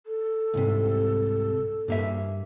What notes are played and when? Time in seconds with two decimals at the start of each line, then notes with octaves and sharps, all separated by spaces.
0.07 A4
0.54 C2 G#2 C3
1.88 G2 A#3 E5